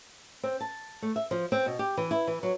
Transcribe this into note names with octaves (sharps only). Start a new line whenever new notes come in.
C4
A5
A3
E5
F3
C4
B2
G4
E3
E4
E3
F#3